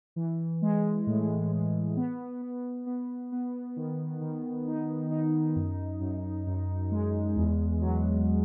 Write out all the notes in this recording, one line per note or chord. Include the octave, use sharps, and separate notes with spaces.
E3
G#3
A2
G#3
B3
B3
B3
B3
D#3
D#3
D#4
D#4
F#2
F#2
F#2
G#3
E2
F#3